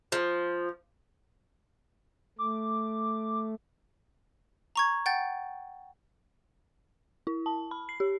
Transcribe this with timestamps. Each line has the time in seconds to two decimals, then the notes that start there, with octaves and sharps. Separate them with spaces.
0.12 F3
2.39 A3 D6
4.76 A#5 C#6 G#6
5.06 F#5 G5 G6 A6
7.27 E4
7.46 A5
7.71 B5
7.89 C7
8.00 G4